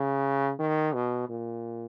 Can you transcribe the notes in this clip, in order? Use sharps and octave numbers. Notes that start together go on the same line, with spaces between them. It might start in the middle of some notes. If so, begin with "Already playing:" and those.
Already playing: C#3
D#3
B2
A#2